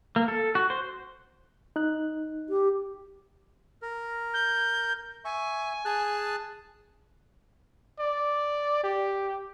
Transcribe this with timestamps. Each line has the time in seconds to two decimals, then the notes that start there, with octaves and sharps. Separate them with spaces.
0.16 A#3
0.28 A4
0.55 F#4
0.70 C5
1.76 D#4 F#6
2.49 G4
3.82 A#4
4.34 G6
5.25 E5 G#5 C#6
5.85 G#4 A5 F#6
7.99 D5
8.84 G4